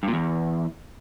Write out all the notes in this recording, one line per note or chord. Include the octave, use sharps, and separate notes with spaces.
G2
A#2
E2